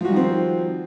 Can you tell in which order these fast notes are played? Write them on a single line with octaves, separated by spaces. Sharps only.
F3 F#4 G3 D#3 C4